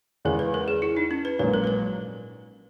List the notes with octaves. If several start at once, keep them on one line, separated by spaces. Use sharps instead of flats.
E2 C#3 G#3 C#4 G#4 A#4
B4
A#4
G#4
E4
D#4
C#4
B4
A#1 G#2 F#3 A#3 C#4 B4
A#4
B4
A#4